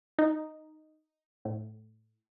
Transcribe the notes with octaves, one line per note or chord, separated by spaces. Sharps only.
D#4
A2